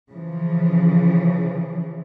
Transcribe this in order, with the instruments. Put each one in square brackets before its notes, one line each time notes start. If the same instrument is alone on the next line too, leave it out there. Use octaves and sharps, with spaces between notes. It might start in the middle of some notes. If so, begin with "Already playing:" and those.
[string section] C#3 E3 F3